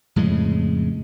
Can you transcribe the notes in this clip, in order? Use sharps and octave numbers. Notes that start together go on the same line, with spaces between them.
F2 A2 C#3 G#3